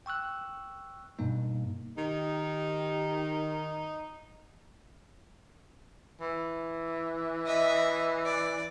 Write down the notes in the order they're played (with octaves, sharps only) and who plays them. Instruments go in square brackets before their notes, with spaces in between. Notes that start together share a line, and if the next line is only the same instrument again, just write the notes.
[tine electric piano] G5 C#6 E6 F#6
G2 B2 G3 A#3 D#4
[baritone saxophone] D#3 [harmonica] D#4 [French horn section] G4
[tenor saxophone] E3
[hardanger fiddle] D#5 E5
D5